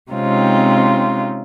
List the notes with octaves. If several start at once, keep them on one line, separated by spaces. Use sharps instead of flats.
C3 G#3 C4 C#4 D#4 F4